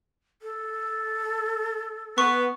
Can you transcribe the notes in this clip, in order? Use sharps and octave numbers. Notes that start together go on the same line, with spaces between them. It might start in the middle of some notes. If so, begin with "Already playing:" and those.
A4
B3 C#6